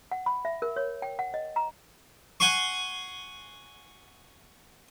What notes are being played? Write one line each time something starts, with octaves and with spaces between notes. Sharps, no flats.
F#5
B5
E5
A#4
C#5
G5
F#5
D#5
A#5
F#5 G#5 C6 C#6